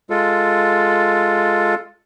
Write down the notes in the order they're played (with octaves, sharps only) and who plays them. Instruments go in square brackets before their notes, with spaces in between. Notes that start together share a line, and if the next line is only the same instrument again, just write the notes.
[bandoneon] G#3 F4 A4